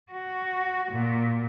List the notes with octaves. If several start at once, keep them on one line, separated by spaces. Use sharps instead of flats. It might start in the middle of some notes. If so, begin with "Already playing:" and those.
F#4
A#2